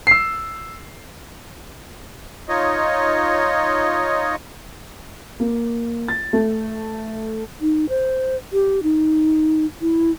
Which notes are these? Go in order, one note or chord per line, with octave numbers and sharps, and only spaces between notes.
E6 C7
D#4 F4 C#5 D#5
A#3
A6
A3
D#4
C5
G4
D#4
E4